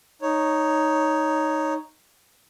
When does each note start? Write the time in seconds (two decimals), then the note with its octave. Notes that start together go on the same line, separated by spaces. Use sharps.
0.22 D#4 C#5